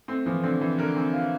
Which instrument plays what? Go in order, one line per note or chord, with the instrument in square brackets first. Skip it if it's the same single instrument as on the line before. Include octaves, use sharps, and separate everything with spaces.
[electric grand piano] A3 [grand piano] C4
[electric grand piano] E3 [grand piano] F3
[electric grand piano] D3 [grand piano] C4
[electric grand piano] E3 [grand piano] C4
[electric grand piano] D3 [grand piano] A#4
[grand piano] C4
F4